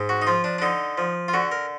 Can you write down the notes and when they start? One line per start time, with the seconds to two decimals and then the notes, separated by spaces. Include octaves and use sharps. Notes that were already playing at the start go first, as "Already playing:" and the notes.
Already playing: G#2 G#3
0.09 F#4
0.22 D#4
0.27 F3 F4
0.44 D4
0.58 D4
0.62 D3 D#4
0.98 F3
1.28 F4
1.33 D3 F#4
1.52 A#4